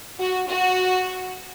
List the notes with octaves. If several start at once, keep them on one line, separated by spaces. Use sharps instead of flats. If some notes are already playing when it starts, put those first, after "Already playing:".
F#4
F#4